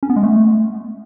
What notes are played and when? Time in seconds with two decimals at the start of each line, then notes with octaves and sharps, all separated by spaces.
0.03 C#4
0.09 B3
0.16 G#3
0.23 A3